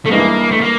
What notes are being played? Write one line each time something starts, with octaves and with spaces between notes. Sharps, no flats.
A3
G2 E3 G#3 A#3 B3
A3
A#3